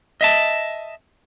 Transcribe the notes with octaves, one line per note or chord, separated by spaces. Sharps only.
D#5 E5 A5